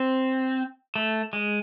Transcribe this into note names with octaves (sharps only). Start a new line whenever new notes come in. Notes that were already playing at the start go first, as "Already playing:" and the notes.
Already playing: C4
A3
G#3